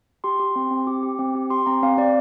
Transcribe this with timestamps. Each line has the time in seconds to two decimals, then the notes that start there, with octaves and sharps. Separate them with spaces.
0.24 G4 C6
0.40 G4
0.56 C4
0.71 C4
0.87 G4 D6
1.03 G4
1.19 C4
1.35 G4
1.50 G4 C6
1.66 C4 A#5
1.83 C4 F5
1.98 C4 D5